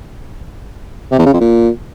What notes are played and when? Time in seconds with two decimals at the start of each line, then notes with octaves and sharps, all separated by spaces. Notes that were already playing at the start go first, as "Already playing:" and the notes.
1.11 C3
1.19 E2
1.26 C#3
1.33 F2
1.41 A#2